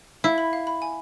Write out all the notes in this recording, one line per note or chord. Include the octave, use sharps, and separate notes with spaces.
E4 F5
B5
F5
B5
G#5